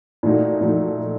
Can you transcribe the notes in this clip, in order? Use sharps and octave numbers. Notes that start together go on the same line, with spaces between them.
A#2 A3 D#4 F#4
A#2 A3 D#4 F#4